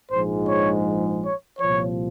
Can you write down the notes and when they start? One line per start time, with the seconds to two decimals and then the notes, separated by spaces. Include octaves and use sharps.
0.10 A#1 G#2 F3 G#3 C5
0.48 C#5
1.23 C#5
1.60 C2 A#2 F3 C#5